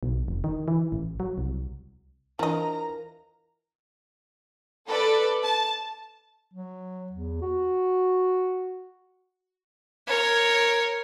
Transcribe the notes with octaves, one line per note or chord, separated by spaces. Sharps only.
B1
F1
D#3
E3
A1
F#3
C2
E3 F3 D4 A#4 D#5 A#5
A4 B4 D5
A5
F#3
E2
F#4
A#4 C#5